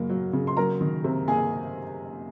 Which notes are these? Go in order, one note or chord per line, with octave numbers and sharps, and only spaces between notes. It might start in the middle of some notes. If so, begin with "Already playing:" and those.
Already playing: F#2 C#3 A#3
F#3
C#3
C6
F#3 A#4 A#5
D#3
C3
A#3 G#4 G#5